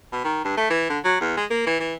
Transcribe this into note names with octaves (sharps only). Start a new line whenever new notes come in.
B2
D#3
G2
A3
E3
D3
F#3
E2
G#3
A#3
E3
E3